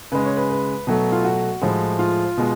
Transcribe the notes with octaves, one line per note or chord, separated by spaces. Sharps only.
C#3 G#3 B4
C#5
B4
B4
B2 F#3 A3
F4
F#4
A2 F3 G#3
F4
B2 G#3